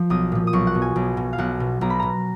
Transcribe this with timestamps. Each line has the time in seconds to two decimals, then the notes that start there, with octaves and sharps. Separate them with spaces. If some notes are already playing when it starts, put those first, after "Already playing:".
Already playing: F3
0.10 B1 D#6
0.32 A#2 F3
0.47 D#6
0.53 B1 C#6
0.67 F#5
0.75 B2
0.82 G#5
0.96 B1
1.17 B2
1.33 F5
1.38 B1 F#5
1.60 B2
1.81 B1 A#5
1.90 B5
1.99 B2 A#5